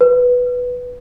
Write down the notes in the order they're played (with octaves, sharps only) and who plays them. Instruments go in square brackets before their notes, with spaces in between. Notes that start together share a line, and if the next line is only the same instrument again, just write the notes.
[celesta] B4